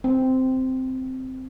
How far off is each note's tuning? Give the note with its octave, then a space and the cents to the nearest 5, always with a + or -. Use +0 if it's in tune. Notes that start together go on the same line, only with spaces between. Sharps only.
C4 -10